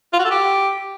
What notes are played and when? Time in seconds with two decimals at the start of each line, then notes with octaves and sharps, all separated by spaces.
0.13 F4
0.19 F#4
0.25 A4
0.31 G4